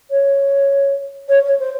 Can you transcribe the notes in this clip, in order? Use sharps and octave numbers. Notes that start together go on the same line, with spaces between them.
C#5
C#5
C#5
C5